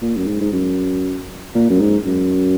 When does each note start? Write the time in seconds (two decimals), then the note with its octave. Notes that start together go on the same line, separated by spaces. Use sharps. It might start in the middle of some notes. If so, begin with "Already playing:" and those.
0.01 A#2
0.16 F#2
0.27 G#2
0.41 G#2
0.53 F#2
1.55 A#2
1.70 F#2
1.80 G#2
2.06 F#2